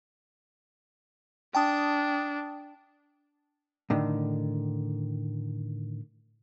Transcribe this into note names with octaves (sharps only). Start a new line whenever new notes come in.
D4 G5 A5 D#6
A2 D3 D#3